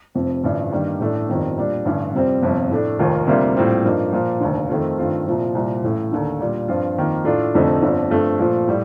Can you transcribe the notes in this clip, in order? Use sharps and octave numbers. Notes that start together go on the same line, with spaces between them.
F1 F2 C3
A1 G2 D3 F3
G2 D#3 G3 A#3 D4
A1 A2 A3 D4
G1 F2 D#3 G3
A#2 G3 D4
A1 G2 D3
F2 C3 G3 C4
G1 F2 C3 F3
A2 A3 D4
F1 D#2 D#3 A#3 F4
D2 C3 G3 A#3 F4
A#1 A2 G3 C4 F4
G2 F3 A#3 D#4
A#2 F3 A#3
F1 D#2 D3
F2 D#3 A3 C4 F4
G2 D#3 A3 C4 F4
C2 A#2 F3
C2 A#2 G3 C4
A1 A2 A3
D#2 D3 A3
A#2 G3 D4
G2 F3 C4 F4
F2 D#3 A#3
A2 A3 D4 F4
F1 F2 D3 A3 D#4
G1 F2 D3
G2 F3 A3 C4
A#2 F3 A3
A2 G3